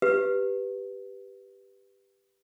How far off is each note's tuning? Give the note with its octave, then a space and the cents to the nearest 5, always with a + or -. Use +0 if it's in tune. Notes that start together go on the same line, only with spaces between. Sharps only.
G4 +0 B4 +0